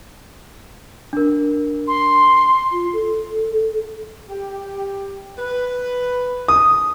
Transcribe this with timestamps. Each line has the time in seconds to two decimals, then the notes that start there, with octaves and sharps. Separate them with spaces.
1.13 D4 A#4
1.88 C6
2.72 F4
2.93 A4
4.29 G4
5.39 B4
6.48 D#6